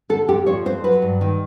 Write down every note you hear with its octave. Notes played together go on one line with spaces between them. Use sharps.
D3 A4
F2 G4
F3 C#5
F2 C5
F#3 B4
G2
D#3